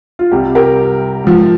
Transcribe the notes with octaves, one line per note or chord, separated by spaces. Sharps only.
F4
C2 C3 G3 G4
G4 A#4
G#2 F3